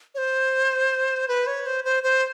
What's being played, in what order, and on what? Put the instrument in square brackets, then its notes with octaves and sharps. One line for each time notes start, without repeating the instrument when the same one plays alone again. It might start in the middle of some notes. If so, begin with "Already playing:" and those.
[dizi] C#5
C5
B4
C#5
C5
C5
C5